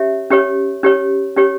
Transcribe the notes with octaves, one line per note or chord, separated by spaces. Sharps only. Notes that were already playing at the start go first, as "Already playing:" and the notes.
Already playing: C#4 G4 C#5 E5
C#4 G4 C#5
C#4 G4 C#5
C#4 G4 C#5